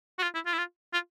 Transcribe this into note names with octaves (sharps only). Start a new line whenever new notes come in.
F#4
F4
E4
F4
E4
F4
F4